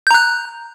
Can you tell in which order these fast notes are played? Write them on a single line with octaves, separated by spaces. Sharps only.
G6 A#5 F#6